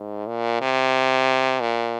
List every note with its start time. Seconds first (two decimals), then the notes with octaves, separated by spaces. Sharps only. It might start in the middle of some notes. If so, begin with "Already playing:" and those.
Already playing: G#2
0.27 A#2
0.61 C3
1.61 A#2